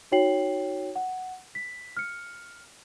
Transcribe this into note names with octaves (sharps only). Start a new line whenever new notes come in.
D#4 F#4 C#5 G5 C7 F#7
F#5
B6
F6 C#7